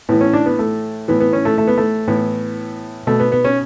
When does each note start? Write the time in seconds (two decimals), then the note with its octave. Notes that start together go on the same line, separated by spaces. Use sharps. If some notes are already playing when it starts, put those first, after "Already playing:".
0.09 A2 E3 B3
0.21 C#4
0.34 D4
0.46 B3
0.59 A3
1.08 A2 E3 B3
1.20 B3
1.33 C#4
1.45 A3
1.58 A3
1.67 B3
1.77 A3
2.08 A2 E3 B3
3.07 B2 A3
3.20 B3
3.32 B3
3.45 C#4